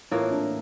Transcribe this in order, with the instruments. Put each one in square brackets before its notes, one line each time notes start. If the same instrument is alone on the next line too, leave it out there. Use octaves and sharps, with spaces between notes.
[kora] A2 E3 A#3 [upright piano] F4
[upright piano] D4